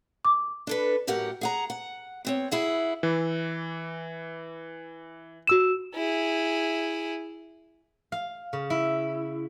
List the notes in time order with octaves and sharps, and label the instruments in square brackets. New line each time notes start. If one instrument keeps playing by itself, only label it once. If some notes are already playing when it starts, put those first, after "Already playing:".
[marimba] D6
[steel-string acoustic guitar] D4 A4 B4
F#2 A2 G4 A#4 F#5
G#4 F#5 A#5
F#5
B3 C4 C#5
E4 G#4 F#5
[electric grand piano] E3
[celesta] F#4 E6 E7
[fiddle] E4 G#4
[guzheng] F5
C#3
E4